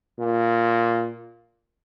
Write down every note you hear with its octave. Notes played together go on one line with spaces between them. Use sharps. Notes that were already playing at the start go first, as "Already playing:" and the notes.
A#2